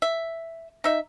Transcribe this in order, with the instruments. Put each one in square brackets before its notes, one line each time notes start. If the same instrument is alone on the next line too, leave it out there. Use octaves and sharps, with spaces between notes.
[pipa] E5
D#4 E5